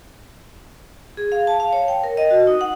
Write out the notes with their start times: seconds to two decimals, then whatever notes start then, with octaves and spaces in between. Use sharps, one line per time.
1.17 G#4
1.32 F5
1.47 A5
1.60 F5
1.73 C#5
1.88 G5
2.04 A#4
2.17 D#5
2.31 F#4
2.47 D#4
2.61 F#5